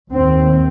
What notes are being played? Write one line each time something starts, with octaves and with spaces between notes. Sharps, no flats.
D#2 C4